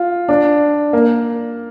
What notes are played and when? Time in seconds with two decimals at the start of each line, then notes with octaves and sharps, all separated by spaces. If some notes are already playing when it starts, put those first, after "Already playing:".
Already playing: F4
0.29 D4
0.93 A#3